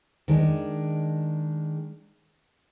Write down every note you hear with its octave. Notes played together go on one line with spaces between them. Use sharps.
D#3 G#3 D4